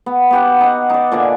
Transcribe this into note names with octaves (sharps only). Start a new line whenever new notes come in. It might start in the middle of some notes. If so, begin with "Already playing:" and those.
B3
B3 G4 F#5
D#4 F#5
D#4 D5
A#2 D3 D5 G#5